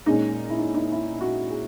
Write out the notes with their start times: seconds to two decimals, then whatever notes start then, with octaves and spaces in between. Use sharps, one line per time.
0.06 A#2 G#3 C#4 D#4
0.50 E4
0.58 D#4
0.74 D#4
0.92 E4
1.21 F#4
1.50 G#4